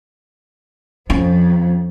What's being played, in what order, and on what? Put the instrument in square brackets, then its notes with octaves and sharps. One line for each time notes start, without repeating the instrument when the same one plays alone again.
[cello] F2 F3 [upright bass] C#4